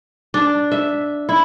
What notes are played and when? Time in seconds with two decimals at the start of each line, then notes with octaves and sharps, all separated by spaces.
0.34 D4
0.72 E5
1.29 E4